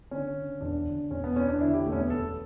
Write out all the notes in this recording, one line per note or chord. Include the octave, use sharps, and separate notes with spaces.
D3 C#4
D3
E1 D4
D3
E1 C#4
B3
E1 C#4
D4
D3 E4
G4
E1 A3
C#4
B3
E1 A4